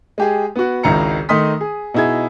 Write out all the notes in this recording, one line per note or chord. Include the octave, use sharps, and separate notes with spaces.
G#3 G4 G#4
B3 F#4
G#1 C#2 D#3 E4 A#5 C#7
D#3 A3 D#4 C6 D#6 B6
G#4
B2 D#4 E4 G#4 G#6